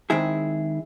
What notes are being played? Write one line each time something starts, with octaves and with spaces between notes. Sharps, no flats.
D#3 G#3 C4 E4 G#4